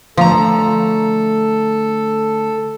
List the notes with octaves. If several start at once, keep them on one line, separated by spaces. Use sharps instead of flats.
D3 F3 A3 A4 A#5